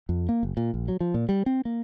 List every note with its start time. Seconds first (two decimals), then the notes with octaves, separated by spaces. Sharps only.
0.09 F2
0.29 A#3
0.43 F#1
0.57 A#2
0.74 A#1
0.88 F#3
1.00 F3
1.14 A#2
1.29 G3
1.46 C4
1.65 A#3